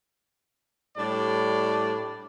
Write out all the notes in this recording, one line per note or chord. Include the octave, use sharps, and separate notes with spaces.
A2 G3 D4 D5